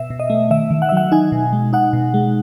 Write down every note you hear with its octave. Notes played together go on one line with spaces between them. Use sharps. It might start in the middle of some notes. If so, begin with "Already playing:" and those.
Already playing: B2 E5
B2
D#5
A3
D#3 E5
D#3
F#5
E5
F#3 F#5
D#4 G#5
B2
G#3
D#4 F#5
B2
G#3